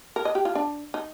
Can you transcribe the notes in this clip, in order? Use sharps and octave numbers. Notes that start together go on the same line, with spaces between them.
A#4
D#5
G4
F4
D4
D#4